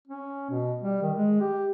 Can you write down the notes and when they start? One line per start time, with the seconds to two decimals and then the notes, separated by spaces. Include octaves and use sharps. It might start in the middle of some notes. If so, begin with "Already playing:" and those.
0.08 C#4
0.50 B2
0.83 G3
1.02 D#3
1.17 G#3
1.40 G4